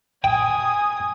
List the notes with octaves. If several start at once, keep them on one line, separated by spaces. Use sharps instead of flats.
G5 G#5 D#6